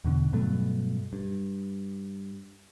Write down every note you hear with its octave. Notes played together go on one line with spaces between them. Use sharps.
E2 B2 D3
G2 B2 F#3 A3
G2